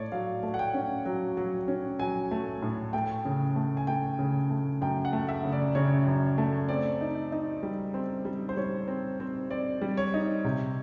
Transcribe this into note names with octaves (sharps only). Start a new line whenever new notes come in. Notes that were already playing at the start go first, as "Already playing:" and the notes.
Already playing: A2 A3 C#5 D5
F#3 F5
A3
F#5
G5
C#4
F#3
F#3
C#4
F#3 G#5
A3
A2
A3 G5
C#3
A3
G#5
A3 G5
C#3
A3
F#2 G5
F#5
A3
E5
C#3
D5
C#3 C#5
F#2
A3
C4 D5
D#4
D#4
G3
C4
G3
C5
G3 C#5
C4
C4
C4 D5
G3
C#5
D#4
C3